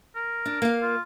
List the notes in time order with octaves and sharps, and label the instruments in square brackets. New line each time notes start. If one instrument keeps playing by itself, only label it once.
[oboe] A#4
[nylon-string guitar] D4
A#3 F5
[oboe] F4